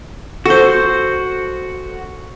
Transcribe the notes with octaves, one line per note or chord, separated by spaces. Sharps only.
F#4 A4 C5